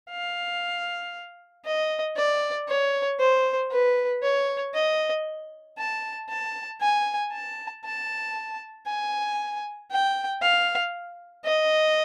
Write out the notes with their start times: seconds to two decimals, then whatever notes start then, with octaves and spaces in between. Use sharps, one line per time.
0.11 F5
1.65 D#5
2.17 D5
2.68 C#5
3.20 C5
3.71 B4
4.23 C#5
4.75 D#5
5.78 A5
6.29 A5
6.81 G#5
7.33 A5
7.85 A5
8.87 G#5
9.91 G5
10.42 F5
11.45 D#5